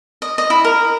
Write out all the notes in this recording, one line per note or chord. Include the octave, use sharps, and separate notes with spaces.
D#5
D#5
E4
A#4